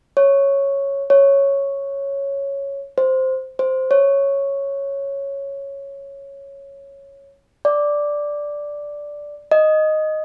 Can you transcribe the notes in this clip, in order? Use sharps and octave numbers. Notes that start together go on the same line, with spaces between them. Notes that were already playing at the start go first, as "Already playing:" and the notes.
C#5
C#5
C5
C5
C#5
D5
D#5